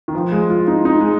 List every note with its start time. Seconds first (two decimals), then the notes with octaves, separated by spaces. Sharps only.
0.08 D#3
0.15 F3
0.32 G#3
0.50 F4
0.68 D#4
0.85 D#4
1.01 G#3